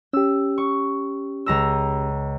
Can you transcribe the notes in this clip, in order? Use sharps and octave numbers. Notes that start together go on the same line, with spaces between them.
C#4 G4 E6
C#6
C#2 A#5 E6